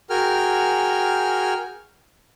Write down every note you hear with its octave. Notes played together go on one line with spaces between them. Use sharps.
F#4 G#4 A#4 G5 G#5 F6